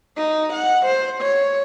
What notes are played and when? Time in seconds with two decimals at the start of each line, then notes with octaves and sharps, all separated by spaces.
0.17 D#4
0.53 F#5
0.85 C5
1.21 C#5